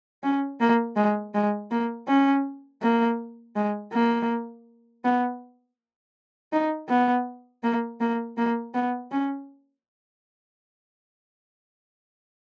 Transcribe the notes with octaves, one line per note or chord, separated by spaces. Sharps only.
C#4
A#3
G#3
G#3
A#3
C#4
A#3
G#3
A#3
B3
D#4
B3
A#3
A#3
A#3
B3
C#4